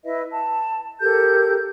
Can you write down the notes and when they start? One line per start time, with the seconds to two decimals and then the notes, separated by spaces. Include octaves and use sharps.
0.04 E4 B4 D#5 E5
0.31 A5
1.01 G4 A4 A#4 G6